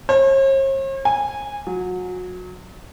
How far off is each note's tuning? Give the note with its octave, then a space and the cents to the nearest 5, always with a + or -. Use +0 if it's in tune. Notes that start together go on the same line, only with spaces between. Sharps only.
C#5 -45
G#5 -15
F#3 -30